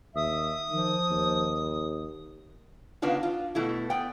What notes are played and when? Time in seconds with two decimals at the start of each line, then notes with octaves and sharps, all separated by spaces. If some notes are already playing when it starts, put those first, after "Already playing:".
0.15 D#2 E5 D#6
0.71 D#3 F3
1.11 D#2
3.02 C#3 A#3 B3 D4 D#4 F4
3.23 F4
3.55 B2 A3 E4
3.90 B3 D5 G5